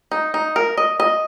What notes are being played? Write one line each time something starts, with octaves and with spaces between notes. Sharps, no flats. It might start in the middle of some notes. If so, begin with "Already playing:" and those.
D#4
D#4
A#4
D#5
D#5